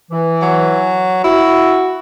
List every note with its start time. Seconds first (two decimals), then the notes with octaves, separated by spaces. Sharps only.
0.11 E3
0.42 F#3
1.24 E4 F#4